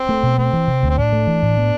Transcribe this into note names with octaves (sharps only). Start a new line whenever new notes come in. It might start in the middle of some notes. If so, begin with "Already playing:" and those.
Already playing: C4
A3
B2
A3 C4
E3
C3
D2
C4
A2 D4
A3
E3
A2
B3